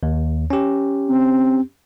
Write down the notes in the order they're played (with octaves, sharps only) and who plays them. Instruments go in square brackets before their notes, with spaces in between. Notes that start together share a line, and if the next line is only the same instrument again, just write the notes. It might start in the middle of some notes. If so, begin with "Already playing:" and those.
[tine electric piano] D#2
C#4 G4
[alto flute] C4